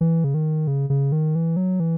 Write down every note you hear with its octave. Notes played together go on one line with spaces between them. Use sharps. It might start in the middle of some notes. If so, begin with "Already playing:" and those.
E3
C#3
D#3
C#3
C#3
D#3
E3
F#3
E3